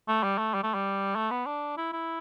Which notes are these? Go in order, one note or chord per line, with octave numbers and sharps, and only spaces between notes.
A3
G3
A3
G3
A3
G3
A3
B3
D4
E4
E4